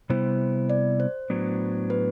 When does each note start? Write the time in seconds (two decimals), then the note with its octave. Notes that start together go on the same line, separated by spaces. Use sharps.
0.10 C3 G3 B3 E4 C5
0.70 D5
1.00 C5
1.30 A2 F#3 B3 D4
1.90 B4